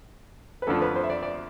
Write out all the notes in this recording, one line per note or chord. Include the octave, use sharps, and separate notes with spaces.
B4
F2 D3 F3 A4
B4
C5
E5
D5
D5